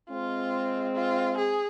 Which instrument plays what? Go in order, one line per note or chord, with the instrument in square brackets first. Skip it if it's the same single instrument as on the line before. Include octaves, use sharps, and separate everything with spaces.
[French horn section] G#3 C4 [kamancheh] F4
[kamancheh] F4
G#4